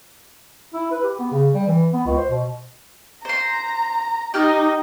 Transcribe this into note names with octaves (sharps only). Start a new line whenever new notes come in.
E4
B4
G4
B3
C#3
G3
E3
B3
C#2
C5
B2
C5 A#5 C6
D#4 G4 F6 G6